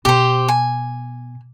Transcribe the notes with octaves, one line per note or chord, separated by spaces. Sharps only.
B2 G4 C5
G#5